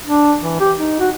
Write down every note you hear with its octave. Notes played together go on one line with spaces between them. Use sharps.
D4
E3
G4
D#4
F#4